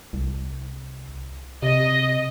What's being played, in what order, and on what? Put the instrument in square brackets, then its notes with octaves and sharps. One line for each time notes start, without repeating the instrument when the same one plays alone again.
[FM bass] C2
[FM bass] C3 [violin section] D#5